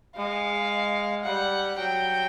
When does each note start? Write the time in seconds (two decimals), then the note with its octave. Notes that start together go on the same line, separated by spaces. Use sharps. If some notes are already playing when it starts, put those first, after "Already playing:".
0.16 G#3 F5
1.24 G3 F#5
1.78 F#3 G5